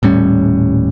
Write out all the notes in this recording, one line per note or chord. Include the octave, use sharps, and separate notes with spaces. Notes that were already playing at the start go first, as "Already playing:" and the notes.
D#1 A2 G3 C#4